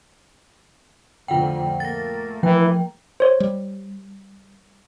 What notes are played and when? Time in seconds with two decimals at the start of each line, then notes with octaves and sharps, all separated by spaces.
1.28 F2 A2 D3 F4 F#5 G5
1.80 A3 A#3 A6 A#6
2.43 E3 F3 G5
3.20 C5 C#5
3.40 G3